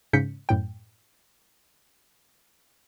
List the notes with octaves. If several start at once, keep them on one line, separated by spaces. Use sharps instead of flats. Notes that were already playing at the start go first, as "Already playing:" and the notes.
G#2 C#3 C#4 G6 B6 C#7
F#2 A2 G5